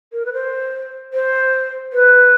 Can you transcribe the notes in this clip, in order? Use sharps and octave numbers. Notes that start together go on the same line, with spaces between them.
A#4
B4
C5
C5
B4